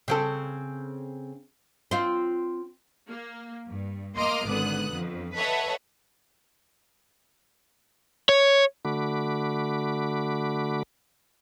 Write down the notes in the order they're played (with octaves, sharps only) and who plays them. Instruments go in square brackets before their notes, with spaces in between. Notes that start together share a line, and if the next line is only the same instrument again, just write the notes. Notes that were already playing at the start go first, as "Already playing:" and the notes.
[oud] C#3 C4 A4
C4 F4
[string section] A#3
G2
A#3 D#5 C6 D6 D#6 F6
G#1 D3 B3 D#6 F#6
F2
A4 B4 C#5 D#5 E5 F#5
[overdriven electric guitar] C#5
[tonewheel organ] D3 A3 F#4 B5 D6